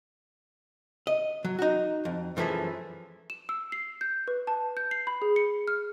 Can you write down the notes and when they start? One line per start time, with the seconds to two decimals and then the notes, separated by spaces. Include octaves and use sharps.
1.07 D#5
1.45 F#3
1.59 D#4 F#4
2.05 F2
2.37 F#2 E3 F3 A3 E4 G#4
3.30 E7
3.49 E6
3.72 C7
4.01 G6
4.28 B4
4.47 A5
4.77 G6
4.91 C7
5.07 B5
5.22 G#4
5.36 C#7
5.68 F6